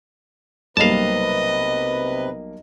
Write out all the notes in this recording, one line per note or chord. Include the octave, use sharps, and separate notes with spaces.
B1 C3 G3 A#3 B4 D#5 F5 A5